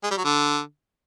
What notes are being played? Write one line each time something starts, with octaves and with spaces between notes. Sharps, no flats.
G#3
G3
F#3
D3